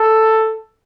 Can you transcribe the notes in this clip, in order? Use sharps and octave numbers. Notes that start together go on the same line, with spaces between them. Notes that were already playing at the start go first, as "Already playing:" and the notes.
Already playing: A4